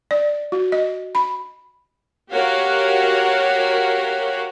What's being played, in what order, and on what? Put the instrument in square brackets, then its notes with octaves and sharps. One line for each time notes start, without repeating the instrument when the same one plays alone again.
[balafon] D5
F#4
D#5
B5
[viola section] F#4 G4 A#4 C#5 F5 F#5